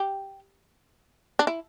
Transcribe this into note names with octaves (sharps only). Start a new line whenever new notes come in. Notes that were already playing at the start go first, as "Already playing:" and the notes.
Already playing: G4
D4
E4